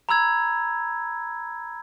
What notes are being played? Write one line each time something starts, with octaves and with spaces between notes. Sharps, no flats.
A#5 B5 E6 G#6